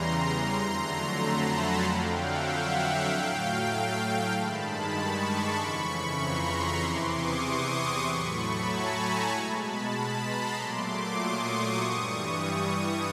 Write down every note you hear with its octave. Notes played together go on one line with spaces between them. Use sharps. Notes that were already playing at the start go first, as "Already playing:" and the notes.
Already playing: E2 C#3 E3 G3 A#5 C6
F2 D3 F#3 A3
A5 B5
F#5 G#5
F2 D3 F#3 F5 G5
E5 F#5
E5 F#5
A2 F#3 A3 F5 G5
G2 D#3 G#3 A5 B5
B5 C#6
C6 D6
F2 C#3 E3 B5 C#6
B5 C#6
A#5 C6
E2 C3 E3 C6 D6
C#6 D#6
A2 F#3 A3 B5 C#6
A5 B5
G#5 A#5
B2 G#3
A5 B5
A5 B5
A#5 C6
A#2 F#3 A3 C6 D6
C#6 D#6
G2 E3 G3